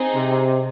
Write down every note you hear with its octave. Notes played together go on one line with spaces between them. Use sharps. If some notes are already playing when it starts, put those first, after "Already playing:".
Already playing: C4 D#4 G#4
C3